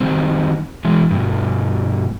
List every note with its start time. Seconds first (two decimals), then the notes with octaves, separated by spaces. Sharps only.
0.01 D#3 G3 C4
0.85 E3 G#3
1.11 G2 B2